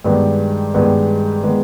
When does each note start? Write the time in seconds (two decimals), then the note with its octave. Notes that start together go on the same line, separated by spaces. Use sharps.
0.04 G2 D#3 G#3 B3
0.74 G2 D#3 G#3 B3
1.43 D#3 G#3 B3